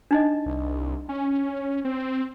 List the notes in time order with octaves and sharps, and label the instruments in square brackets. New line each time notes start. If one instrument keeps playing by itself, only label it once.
[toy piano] D4 D#4 D#5
[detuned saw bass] C2
C#4
C4